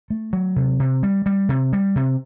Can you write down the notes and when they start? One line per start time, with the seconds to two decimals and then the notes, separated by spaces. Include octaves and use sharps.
0.10 A3
0.33 F#3
0.56 C3
0.80 C3
1.03 G3
1.26 G3
1.49 C3
1.73 G3
1.96 C3